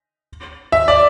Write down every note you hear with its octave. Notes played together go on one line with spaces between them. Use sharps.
E5
D5